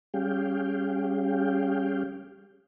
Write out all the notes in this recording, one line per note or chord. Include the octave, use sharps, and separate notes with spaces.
G3 C#4 G4 G#4 F5 G5